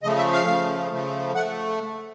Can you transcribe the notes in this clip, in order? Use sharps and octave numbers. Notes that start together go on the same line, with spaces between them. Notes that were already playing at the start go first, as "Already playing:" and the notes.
C#3 F3 A3 D#5
E5
F5
C#3 F3 A3
C#3 F3 A3
A3 F#5